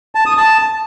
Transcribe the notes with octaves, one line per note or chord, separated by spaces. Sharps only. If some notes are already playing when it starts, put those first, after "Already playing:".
A5
D#6
A5